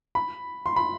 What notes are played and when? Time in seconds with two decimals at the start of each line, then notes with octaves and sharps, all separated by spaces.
0.15 B5
0.66 C6
0.76 B5